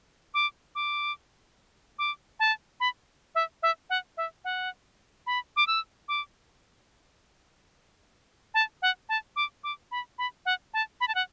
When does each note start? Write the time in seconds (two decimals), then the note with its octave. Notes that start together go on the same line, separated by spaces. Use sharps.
0.34 D6
0.75 D6
1.99 D6
2.40 A5
2.80 B5
3.35 E5
3.63 E5
3.90 F#5
4.17 E5
4.45 F#5
5.27 B5
5.56 D6
5.67 E6
6.08 D6
8.54 A5
8.82 F#5
9.09 A5
9.36 D6
9.64 D6
9.91 B5
10.18 B5
10.46 F#5
10.74 A5
11.01 B5
11.08 A5
11.15 F#5